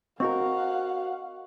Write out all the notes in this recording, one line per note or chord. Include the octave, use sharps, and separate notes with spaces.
C4 F#4 A#4 D#5 F5 F#5 C#6